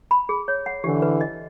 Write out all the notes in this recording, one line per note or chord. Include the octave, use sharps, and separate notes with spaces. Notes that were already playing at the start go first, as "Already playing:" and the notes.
B5
G#4
C#5
F#5
D3 E3 G4
B4
D#5